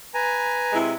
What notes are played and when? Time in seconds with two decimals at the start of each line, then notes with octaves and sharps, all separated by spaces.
0.14 B4 G#5 A#5
0.73 C3 G#3 E4